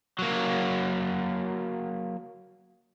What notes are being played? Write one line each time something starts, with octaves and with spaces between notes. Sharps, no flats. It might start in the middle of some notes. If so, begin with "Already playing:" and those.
F#3 A#3